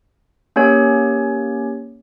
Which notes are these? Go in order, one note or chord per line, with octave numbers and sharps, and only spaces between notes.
A#3 C#4 G4 C#5